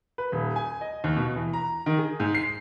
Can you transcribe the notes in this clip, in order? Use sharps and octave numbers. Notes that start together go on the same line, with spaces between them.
B4
D#1
G#5
D#5
D#2
B2
E3
A#5
D#3
G#4
G#2
C7